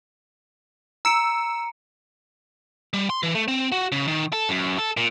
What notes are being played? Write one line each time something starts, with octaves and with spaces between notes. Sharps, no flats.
A#5 E6 C#7 D7
G3
C6
E3
A3
C4
F#4
C#3
D#3
A4
F#2
A4
A#2